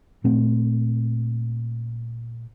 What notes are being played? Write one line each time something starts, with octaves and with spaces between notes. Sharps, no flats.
A#2 A3 C4